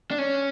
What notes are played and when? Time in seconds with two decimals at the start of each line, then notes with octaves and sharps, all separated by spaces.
0.11 D4
0.18 C#4